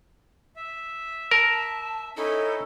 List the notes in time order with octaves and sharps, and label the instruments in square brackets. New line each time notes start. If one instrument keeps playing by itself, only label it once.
[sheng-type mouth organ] E5
[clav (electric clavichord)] A#4 [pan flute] A5
[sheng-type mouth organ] C#4 D#4 E4 [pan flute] A4